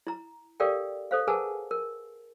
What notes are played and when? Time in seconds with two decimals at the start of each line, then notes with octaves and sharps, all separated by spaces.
0.07 E4 A#5
0.60 G4 A4 A#4 D5 F5 G5
1.11 A4 C5 F5
1.28 G#4 A#4 B4 F#5 G#5 A5
1.71 A#4